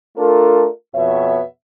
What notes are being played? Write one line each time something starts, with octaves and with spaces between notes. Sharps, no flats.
A3 D4 F4 A4 A#4
F2 B2 B3 C#5 E5